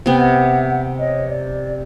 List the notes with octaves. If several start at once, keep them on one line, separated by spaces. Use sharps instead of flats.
C3 B3 G5
E5 F#5
C#5 D#5
D5